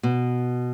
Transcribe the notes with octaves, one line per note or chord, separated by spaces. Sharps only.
B2